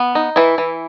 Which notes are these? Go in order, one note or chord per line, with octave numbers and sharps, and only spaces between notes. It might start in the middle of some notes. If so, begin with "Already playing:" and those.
Already playing: B3
D#4
E3 E4
E3